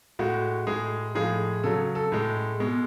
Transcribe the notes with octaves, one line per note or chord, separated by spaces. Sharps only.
A2 G#3 F#4
A2 G#3 G#4
A2 F3 G#3 G#4
C#3 F#3 A4
A4
A2 G#3
B2 G#3